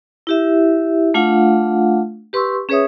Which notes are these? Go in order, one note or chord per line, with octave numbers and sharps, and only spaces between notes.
E4 G4 E5
A3 D4 F4 F5 F#5
G4 B4 C6 C#6 E6
C#4 G#4 B4 C#5 E5 D#6